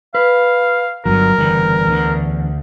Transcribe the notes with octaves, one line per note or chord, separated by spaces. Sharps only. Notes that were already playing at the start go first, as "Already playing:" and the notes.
B4 F5
G1 G2 F#3 A#4
F#1 E2 D3 G3
D2 D3